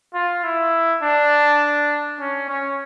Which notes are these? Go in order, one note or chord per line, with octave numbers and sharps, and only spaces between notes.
F4
E4
D4
C#4
C#4